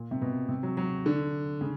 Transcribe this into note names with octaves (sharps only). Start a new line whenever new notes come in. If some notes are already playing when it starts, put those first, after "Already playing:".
Already playing: A#2
C3
B2
C3
F#3
F#3
D3
C#3